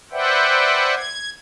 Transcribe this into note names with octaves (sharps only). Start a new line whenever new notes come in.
B4 C5 D5 E5 F#5 G5
G#6